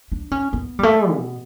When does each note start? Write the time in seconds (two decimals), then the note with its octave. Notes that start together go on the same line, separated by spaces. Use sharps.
0.12 D4
0.31 C#4
0.53 B3
0.79 G3
0.83 A3
1.14 B2